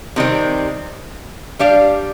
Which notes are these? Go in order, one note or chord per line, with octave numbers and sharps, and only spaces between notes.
C3 D#3 G3 C4
G3 D4 G4 D5 F5